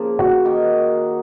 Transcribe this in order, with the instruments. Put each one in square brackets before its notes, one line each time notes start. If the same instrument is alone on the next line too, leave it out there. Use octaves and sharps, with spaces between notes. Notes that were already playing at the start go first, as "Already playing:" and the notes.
Already playing: [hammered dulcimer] C#3 F3 A#3
[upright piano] F#4
[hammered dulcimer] D#3 A#3 D#4